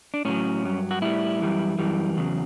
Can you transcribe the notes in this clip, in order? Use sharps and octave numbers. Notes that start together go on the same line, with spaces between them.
D4
A2 F#3 C#4
G2 F#3
F#4
A2 G3 E4
F#2 E3 G3
F#2 E3 G3
E2 C#3 F#3